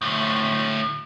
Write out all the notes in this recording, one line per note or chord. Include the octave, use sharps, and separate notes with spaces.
D2 A2